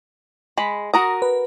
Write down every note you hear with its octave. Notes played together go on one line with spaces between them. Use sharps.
G#3 B5
F#4 A#4 A#5 D#6
B4